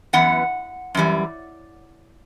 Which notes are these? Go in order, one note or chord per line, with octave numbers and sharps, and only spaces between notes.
F#2 E3 B3 F#5
F#2 E3 G3